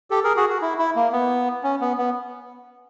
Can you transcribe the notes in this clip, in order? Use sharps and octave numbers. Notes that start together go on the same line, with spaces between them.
G4 A4
G#4 A#4
F#4 G#4
F#4
E4
E4
A#3
B3
C#4
B3
B3